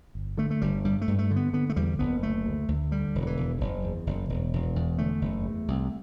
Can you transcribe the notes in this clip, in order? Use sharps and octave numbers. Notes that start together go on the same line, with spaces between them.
G1
D3 A3
A3
G1 G3
G2 G3
A3
G2
A3
D3
B3
D3 B3
A3
E2 G3
F#1 B3
D2 A3
D2
D2
D3 G3
E1
F#3
E3
E1
F#1
E2
F#1
E1
E1
E2
D3 A3
F#1
E2
C2